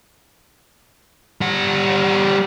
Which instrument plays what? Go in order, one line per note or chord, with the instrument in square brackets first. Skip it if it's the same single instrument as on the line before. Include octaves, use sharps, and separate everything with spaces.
[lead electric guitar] G3 F#5